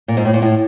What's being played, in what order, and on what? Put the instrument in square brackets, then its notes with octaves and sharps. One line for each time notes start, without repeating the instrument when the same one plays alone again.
[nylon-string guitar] A#2
G#2
A2
A#2
A2